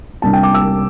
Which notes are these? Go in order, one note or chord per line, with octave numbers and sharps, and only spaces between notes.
C2 C3 G3 D4 A5
G5
D6
E6